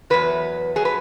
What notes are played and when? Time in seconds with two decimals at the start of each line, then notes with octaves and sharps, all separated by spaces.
0.10 E2 C#3 F#3 B4
0.76 F#3 G#4
0.85 B4